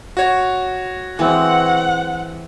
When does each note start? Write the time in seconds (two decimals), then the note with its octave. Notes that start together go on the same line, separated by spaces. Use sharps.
0.17 F#4 C#5
1.19 E3 G#3 C4 F#5